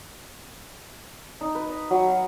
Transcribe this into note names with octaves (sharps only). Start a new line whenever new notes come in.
D#4
B4
D#5
F#3
F5